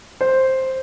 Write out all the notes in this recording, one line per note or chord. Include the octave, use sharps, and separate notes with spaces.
C5